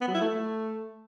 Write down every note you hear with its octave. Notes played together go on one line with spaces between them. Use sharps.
B3
F#3
E4
A3